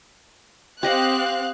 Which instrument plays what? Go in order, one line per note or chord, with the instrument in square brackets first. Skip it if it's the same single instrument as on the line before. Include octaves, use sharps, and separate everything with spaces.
[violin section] C4 F5 F#6 [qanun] G4 D#5 F#5